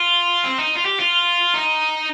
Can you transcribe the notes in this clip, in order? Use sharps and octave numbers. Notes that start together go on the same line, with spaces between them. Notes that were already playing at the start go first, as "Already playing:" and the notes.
Already playing: F4
C4
D#4
F4
G4
F4
D#4